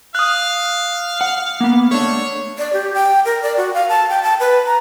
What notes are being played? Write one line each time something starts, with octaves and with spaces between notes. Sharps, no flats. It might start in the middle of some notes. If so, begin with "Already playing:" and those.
F5 D#6 F#6
F#5
A#3 B3
A3 D4 C#5
D5
G4
G5
A#4
D5
F#4
F5
A5
G5
A5
B4
A#5